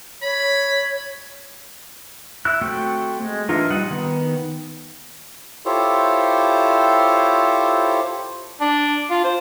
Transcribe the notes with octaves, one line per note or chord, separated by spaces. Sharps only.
C#5 B5
E4 F#6
A3 C4 F#4 F#5 G5
G#3
E3 D4 D#4 F4 A#4
G3 D#5 F#5
D#3 B3
E4 F4 G4 A4 C5 C#5
D4
F4
C5